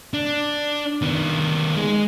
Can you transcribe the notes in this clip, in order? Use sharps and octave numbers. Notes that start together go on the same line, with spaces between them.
D4
D#3 B3
G#3 G#4